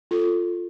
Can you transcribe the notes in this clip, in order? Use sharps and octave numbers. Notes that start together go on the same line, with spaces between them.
F4 A4